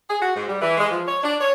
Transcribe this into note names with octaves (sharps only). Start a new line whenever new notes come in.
G#4
F#4
G#2
G3
E3
G#3
F3
C#5
D4
C#5